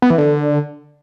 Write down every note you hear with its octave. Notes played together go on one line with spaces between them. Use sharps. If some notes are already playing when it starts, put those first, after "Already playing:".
B3
E3
D3